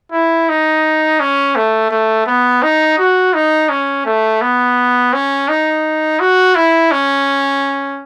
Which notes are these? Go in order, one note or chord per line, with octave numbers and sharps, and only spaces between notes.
E4
D#4
C#4
A3
A3
B3
D#4
F#4
D#4
C#4
A3
B3
C#4
D#4
F#4
E4
C#4